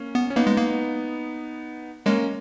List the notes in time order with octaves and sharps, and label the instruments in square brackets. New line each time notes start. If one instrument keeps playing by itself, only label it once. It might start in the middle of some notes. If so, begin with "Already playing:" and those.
Already playing: [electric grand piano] A#3 C#4
[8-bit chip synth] B3
[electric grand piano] C#4
[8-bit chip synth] A#3 [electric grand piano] B3 D#4
[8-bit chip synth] G#3
A#3
[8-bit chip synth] G#3 [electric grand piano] A#3 C#4